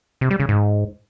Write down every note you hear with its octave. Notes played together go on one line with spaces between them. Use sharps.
C3
G3
C#3
G#2